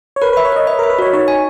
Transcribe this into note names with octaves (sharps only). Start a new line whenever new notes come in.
C#5
A#4 B4
B4
E5
C#5
A#4 D#5
C#5 E5
A#4
E5
B4
F#4 C#5
D#4 C#5
G#5